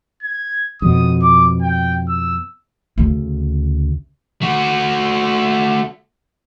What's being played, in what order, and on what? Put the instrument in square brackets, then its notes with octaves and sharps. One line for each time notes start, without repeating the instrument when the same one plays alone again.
[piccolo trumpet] G#6
[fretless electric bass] F2 B2 [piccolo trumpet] D#6
[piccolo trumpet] D6
G5
E6
[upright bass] D2 C#3
[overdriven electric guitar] A3 F#4